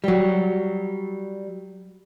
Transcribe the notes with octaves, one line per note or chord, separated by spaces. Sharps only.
F#3 G3